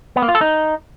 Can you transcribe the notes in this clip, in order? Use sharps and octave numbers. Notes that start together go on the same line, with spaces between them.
B3
A#3
F4
A4
D#4